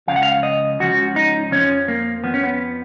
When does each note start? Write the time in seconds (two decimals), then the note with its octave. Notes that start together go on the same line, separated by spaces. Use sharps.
0.08 C#2 C#3 F3 F5
0.16 F#5
0.23 F5
0.43 D#5
0.80 C#2 C#3 F3 F#4
1.16 D#4
1.51 F2 F3 C#4
1.88 A#3
2.24 F2 F3 B3
2.34 C#4
2.44 B3